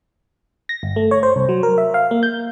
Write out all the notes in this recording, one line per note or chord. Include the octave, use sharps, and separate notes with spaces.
A#6
G1
A3
C#5
C5
C2
F#3
A#4
E5
F5
A#3
G6